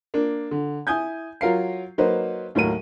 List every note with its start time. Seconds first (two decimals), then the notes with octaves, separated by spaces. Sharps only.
0.14 A#3 D4
0.51 D3
0.87 E4 G#5 D#6 G6 G#6
1.41 F#3 F4 A#4 F5 C7
1.98 F#3 A#3 D#4 B4 C5
2.55 D#2 A2 F#3 A#4 D#7